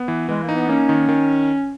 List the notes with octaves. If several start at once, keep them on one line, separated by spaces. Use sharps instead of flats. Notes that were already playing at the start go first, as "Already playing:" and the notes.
Already playing: B3
E3
E3 G#3
A#3
D#4
B3
A#3 C#4
D#3
D#3